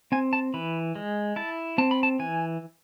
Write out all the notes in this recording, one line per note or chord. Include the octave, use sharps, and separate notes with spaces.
C4 G#5
A5
E3 B5
G#3
E4 A5
C4 A5
B5
A5
E3 G#5